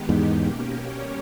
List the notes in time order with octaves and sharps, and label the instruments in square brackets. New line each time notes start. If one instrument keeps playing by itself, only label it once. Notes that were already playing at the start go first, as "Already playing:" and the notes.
Already playing: [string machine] D#3 G#3 B3 D#4 G4
[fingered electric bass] E2 G#2
[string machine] B2 A#3 C#4 G4
G3 C#4 G4 A#4 C#5